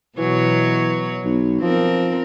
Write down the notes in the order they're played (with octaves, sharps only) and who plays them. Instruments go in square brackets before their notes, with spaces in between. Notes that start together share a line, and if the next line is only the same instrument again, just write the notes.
[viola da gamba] B2 F#3 C#5 [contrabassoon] E3
[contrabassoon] B1
[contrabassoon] F3 [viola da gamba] C4 A#4